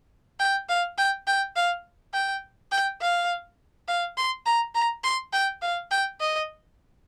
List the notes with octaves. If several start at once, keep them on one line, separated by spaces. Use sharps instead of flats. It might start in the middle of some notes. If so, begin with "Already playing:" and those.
G5
F5
G5
G5
F5
G5
G5
F5
F5
C6
A#5
A#5
C6
G5
F5
G5
D#5